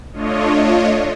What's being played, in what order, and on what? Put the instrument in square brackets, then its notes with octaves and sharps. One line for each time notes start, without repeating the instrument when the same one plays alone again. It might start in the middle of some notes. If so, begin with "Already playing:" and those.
[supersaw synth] A3 D4 F4 C#5 D#5